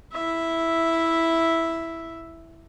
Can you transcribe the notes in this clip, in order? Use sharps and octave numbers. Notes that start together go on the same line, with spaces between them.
E4 E5